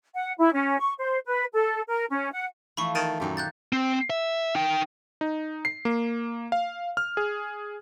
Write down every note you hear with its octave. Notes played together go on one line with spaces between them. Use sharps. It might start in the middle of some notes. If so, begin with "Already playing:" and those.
F#5
E4
C#4
C#6
C5
B4
A4
A#4
C#4
F#5
E3 F3 A3 B5 C#6
D#3 A5 A6 D#7
F#2 A#2 D#3 G4
F#6 G6 A6
C4
E5
D#4 G5
D#4
C7
A#3
F5
F6
G#4